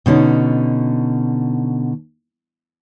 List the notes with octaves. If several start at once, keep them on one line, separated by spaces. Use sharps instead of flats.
B2 D3 C#4 D#4